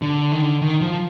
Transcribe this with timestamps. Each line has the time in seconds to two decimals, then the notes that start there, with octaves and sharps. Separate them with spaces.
0.02 D3
0.32 D#3
0.42 D3
0.62 D#3
0.82 F3